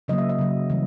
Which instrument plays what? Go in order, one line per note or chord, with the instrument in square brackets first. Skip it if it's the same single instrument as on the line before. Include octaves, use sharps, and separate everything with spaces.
[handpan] C#3 F#3 A#3 D#5
E5
D#5
C#3 F#3 A#3
C#3 E3 G3